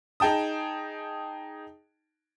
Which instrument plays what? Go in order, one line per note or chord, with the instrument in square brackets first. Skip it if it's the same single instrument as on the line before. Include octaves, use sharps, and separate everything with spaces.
[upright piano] D#4 G#4 G5 A5 D#6